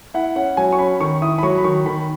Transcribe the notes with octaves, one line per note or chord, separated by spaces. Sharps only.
E4 F#5
C#4 F#5
F#3 G#5
C#6
C#4 B5
D#3 C#6
E4 D#6
B5
F#3 C#6
B5
D#3 C#6
D#3 B5